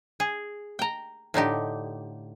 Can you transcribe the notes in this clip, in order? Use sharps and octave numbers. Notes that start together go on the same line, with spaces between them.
G#4
G5 A#5
A2 D3 D#4 G4